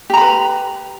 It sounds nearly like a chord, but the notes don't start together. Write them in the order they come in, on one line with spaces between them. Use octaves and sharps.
G4 A#5 B5 B4